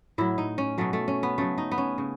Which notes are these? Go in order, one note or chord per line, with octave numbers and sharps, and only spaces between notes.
A2 F#3 E4
D#4
C#4
B2 F#3 A3
A3
C#4
B3
C#3 F#3 A3
D#4
B3
C#4
C#3